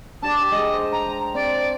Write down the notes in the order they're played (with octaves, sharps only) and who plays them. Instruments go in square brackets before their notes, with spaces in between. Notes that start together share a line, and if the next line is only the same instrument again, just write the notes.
[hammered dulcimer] D4 G4 D5 [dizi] A5
[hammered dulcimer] G#3 [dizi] D#5
[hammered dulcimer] C5
[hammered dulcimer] G5 [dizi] A#5
[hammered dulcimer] C4 [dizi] D5